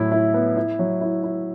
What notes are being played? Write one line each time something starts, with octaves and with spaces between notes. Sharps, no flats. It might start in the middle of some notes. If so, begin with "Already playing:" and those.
Already playing: A2 F#3 E4
E4
B3
E4
F#3
E4
E4